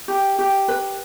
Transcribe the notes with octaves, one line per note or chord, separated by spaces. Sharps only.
G4
G4
B4